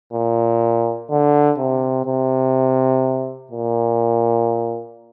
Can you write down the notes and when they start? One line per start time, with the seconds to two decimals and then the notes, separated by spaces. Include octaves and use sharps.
0.13 A#2
1.10 D3
1.58 C3
2.06 C3
3.51 A#2